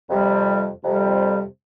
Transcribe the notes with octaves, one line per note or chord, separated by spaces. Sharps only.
F2 C3 G3
F2 C3 G3